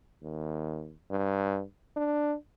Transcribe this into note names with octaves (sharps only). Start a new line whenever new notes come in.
D#2
G2
D4